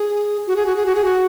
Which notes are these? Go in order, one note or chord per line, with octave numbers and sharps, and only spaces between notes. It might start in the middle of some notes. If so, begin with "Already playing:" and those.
Already playing: G#4
F#4
G#4
F#4
G#4
F#4
G#4
F#4